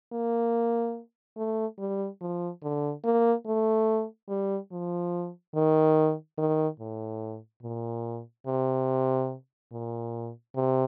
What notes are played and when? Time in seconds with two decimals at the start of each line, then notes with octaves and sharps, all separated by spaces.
0.13 A#3
1.37 A3
1.79 G3
2.21 F3
2.63 D3
3.04 A#3
3.47 A3
4.29 G3
4.72 F3
5.55 D#3
6.39 D#3
6.80 A2
7.63 A#2
8.47 C3
9.72 A#2
10.56 C3